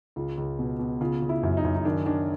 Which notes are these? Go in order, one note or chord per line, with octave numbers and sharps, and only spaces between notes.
C#2 F4
C#2
B2
B2
C#3 F4
C#3
E4
F#2
D#4
F#2
D#4
D#3 D4
D#3 D4